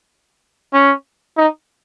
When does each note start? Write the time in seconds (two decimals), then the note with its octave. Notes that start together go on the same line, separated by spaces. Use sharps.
0.73 C#4
1.37 D#4